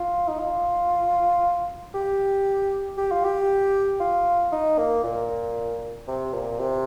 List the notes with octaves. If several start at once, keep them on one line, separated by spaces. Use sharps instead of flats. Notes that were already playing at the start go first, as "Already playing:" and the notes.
Already playing: F4
D#4
F4
G4
G4
F4
G4
F4
D#4
A#3
A#2
C3
A#2
C3